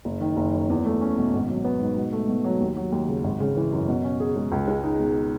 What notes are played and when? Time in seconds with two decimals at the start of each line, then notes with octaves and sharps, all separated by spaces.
0.05 F#1
0.21 D#3
0.37 F#1
0.53 F#2
0.70 E2
0.86 A3
1.01 C#4
1.18 B2
1.34 G#1
1.49 F#3
1.64 B3
1.80 G#2
1.96 B2
2.12 A3
2.28 B2
2.44 F#3
2.60 D#2
2.77 F#3
2.92 D#2
3.09 C#3
3.24 G#1
3.40 C#3
3.57 E3
3.73 F#2
3.88 B2
4.04 C#4
4.20 G#4
4.36 G#3
4.52 C#2
4.68 G#3
4.83 D#4
5.00 B2